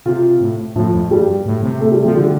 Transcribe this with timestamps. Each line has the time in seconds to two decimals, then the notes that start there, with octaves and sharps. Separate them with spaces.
0.06 C3 F4
0.41 A2
0.76 A2 F3
0.93 F2
1.10 G2 G3
1.46 A2
1.63 C3
1.80 A3
1.92 G3
2.04 F3 A3
2.15 D3 G3